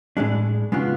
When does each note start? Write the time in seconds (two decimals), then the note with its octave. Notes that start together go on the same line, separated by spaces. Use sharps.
0.17 A2 G#3 D4
0.72 C#3 G#3 B3 D4 F4